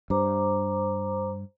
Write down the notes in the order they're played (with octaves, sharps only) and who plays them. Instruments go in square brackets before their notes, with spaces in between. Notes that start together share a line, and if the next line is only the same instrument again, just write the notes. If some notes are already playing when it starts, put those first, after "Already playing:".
[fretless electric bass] G2 [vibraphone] C5 A#5 D6